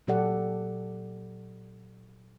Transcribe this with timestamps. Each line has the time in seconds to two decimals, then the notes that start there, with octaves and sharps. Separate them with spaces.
0.07 A#2 F#3 G4 A4 D5 F#5